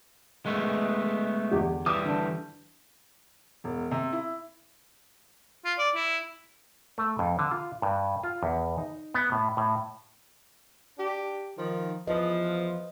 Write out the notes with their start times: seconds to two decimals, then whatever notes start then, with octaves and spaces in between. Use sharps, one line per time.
0.46 G#3 A3 B3
1.51 E2 D3 G4
1.86 E3 G3 D#6
2.04 D3 D4
3.64 E1
3.91 C3
4.13 E4
5.65 F4
5.78 D5
5.95 E4
6.98 A3
7.19 F2
7.39 D3
7.51 F4
7.82 G2
8.23 F4
8.43 E2
8.78 D#4
9.14 B3
9.32 A2
9.57 A2
10.98 D4 G4
11.58 D#3 F3
12.07 E2 E3 F3 F4 B4 D#5